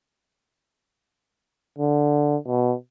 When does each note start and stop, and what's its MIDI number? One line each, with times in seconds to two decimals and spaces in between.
1.78 2.36 50
2.48 2.74 47